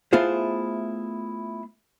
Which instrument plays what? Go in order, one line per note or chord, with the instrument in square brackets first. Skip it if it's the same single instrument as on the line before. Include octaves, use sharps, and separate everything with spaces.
[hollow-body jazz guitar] A3 B3 E4 F4 G#4 C5